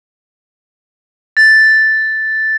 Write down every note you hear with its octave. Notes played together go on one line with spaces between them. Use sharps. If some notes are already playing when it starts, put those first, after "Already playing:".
A6